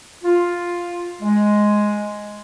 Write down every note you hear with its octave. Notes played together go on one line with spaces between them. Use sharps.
F4
G#3